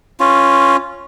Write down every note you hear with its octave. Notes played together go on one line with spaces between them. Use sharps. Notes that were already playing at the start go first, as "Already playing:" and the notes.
C#4 F4